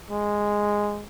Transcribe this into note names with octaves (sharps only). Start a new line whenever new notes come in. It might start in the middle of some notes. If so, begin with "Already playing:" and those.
G#3